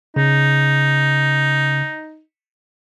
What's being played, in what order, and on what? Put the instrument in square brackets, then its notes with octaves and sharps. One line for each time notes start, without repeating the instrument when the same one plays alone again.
[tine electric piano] C#3 [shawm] D#4